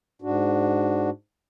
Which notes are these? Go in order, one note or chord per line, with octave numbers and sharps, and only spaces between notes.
G#2 D4 F#4